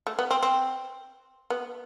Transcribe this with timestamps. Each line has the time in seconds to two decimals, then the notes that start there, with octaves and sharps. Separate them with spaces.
0.07 A3
0.19 B3
0.31 C4
0.43 C4
1.50 B3